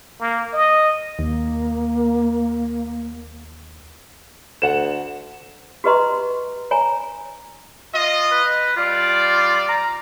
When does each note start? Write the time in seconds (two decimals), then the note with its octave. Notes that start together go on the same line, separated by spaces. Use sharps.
0.20 A#3
0.54 D#5
1.19 D#2 A#3
4.62 D2 F#5 E7
5.84 F#4 G4 B4 D#5 A#5 C6
6.71 C#5 G#5 A#5
7.94 F4 D#5
8.32 B4
8.77 G3 F4 D5
9.69 A#5